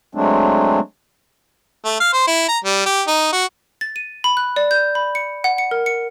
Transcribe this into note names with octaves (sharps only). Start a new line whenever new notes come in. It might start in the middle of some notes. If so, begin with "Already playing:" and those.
F#3 G#3 A3 C4 D4
A3
F5
C5
E4
A#5
G3
G4
D#4
F#4
A6
D#7
B5
F#6
D5
G6
B5
C#7
F#5
C#7
A#4
C#7